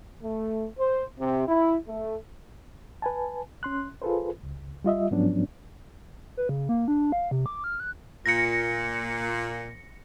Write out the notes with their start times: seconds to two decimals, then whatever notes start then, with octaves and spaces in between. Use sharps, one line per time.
0.24 A3
0.79 C5
1.19 C3
1.48 E4
1.88 A3
3.02 B4 G#5 A5
3.63 C#4 C6 F#6
4.02 F4 G#4 A4 B4 C5
4.43 C#2
4.84 G3 F4 D#5 E5
5.11 G#2 F3 F#3 B3 C#4 D4
6.37 B4
6.49 C#3
6.69 A#3
6.88 D4
7.12 F5
7.31 C3
7.46 D6
7.64 F6
7.80 F#6
8.26 A#2 A#6 C#7